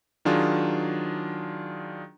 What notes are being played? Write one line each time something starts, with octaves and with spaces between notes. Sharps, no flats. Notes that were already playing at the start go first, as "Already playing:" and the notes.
D#3 F#3 D4 F4 G#4